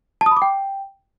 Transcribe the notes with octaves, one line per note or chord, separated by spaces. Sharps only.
A5
D#6
B5
D6
G5